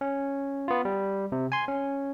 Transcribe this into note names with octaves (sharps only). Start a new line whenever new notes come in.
C#4
B3 F4
G3
C3
G#5 C6
C#4